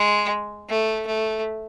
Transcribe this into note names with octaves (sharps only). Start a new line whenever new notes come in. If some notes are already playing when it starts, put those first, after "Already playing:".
Already playing: G#3
A3
A3